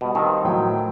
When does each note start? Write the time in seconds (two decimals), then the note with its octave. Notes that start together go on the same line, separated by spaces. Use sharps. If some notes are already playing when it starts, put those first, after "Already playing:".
0.01 B2 G3 G4
0.15 D#3 F3 C4
0.45 A2 F#3 G5